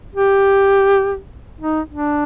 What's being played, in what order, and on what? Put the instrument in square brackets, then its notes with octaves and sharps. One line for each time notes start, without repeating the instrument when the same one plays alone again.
[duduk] G4
D#4
D4